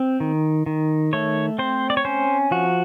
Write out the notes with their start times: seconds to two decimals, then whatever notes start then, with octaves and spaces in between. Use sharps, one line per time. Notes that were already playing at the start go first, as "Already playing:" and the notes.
Already playing: C4
0.20 D#3
0.66 D#3
1.13 A3 C#5
1.59 C4 C5
1.90 D5
1.97 C#5
2.05 C#4 C5
2.51 F3 F#4